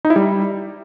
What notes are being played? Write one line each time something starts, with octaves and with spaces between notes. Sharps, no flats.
D#4
E4
G3